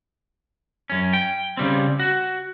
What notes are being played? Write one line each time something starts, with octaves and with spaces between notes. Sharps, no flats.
F#2 C#4
G5
C#3 G3 C4
F#4